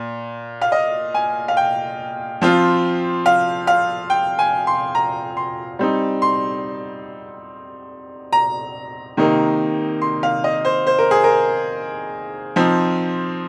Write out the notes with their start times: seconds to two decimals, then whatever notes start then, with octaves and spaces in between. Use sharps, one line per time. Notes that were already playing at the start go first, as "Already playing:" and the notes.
Already playing: A#2
0.61 F5
0.72 D#5
1.14 G#5
1.48 F5
1.57 G5
2.41 F3 C4 F4
3.26 F5
3.67 F5
4.10 G5
4.39 G#5
4.67 C6
4.95 A#5
5.37 C6
5.79 G3 C4 D#4
6.22 C6
8.33 A#5
9.17 C3 D#3 A#3 D#4
10.02 C6
10.23 F5
10.44 D#5
10.65 C5
10.87 C5
10.99 A#4
11.11 G#4
11.24 A#4
12.56 F3 C4 D#4